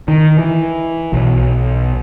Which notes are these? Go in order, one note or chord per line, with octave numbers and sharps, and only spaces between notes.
D#3
E3
B1